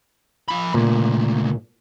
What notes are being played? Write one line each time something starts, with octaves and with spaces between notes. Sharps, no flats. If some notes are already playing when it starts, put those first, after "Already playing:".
F3 B5
C#2 A#2 A3